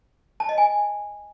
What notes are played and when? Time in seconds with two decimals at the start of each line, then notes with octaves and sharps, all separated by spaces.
0.40 A5
0.49 D#5
0.58 G#5